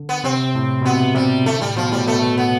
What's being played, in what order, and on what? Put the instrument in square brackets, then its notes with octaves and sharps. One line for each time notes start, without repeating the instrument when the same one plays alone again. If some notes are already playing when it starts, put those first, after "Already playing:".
Already playing: [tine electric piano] D3
[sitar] B3
[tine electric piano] C3 [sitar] C4
[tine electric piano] A2
B2
[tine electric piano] C3 [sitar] B3
[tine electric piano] C3 [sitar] G3
[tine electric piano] D3 [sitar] A3
[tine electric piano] A2 [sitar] G3
[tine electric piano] B2 [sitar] F3
[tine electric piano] A2 [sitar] G3
[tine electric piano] B2 [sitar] A3
[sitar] B3